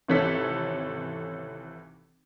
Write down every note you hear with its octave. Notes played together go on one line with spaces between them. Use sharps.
G#1 C3 E3 C#4 A4 B6